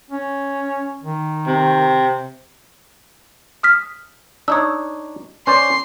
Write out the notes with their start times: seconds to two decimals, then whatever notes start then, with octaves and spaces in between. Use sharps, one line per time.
0.10 C#4
1.02 D#3
1.47 C3
3.63 D#6 F6 B6
4.48 D4 D#4 C#5 D#6 E6
5.47 C#4 C5 D5 C6